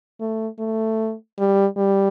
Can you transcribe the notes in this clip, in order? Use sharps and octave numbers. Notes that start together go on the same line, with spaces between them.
A3
A3
G3
G3